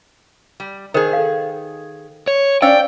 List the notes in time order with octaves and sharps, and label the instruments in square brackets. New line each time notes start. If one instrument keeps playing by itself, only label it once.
[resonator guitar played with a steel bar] G3
[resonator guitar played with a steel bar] D#3 G#4 [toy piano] A#4 C5
[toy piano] A4 F5
[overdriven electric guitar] C#5
[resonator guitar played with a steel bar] C#4 D4 D5 [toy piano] C5 F5 E6 [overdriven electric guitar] G5